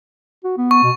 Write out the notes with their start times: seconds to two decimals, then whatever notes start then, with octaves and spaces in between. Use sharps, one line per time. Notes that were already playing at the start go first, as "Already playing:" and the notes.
0.44 F#4
0.58 B3
0.71 C#6
0.83 B2